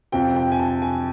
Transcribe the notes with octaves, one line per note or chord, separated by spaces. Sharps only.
F2 C3 F3 G5
G5
G#5
A5
G#5